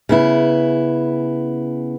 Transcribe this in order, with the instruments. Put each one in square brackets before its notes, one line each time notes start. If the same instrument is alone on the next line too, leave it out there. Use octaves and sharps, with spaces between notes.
[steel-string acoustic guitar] C#3 B3 E4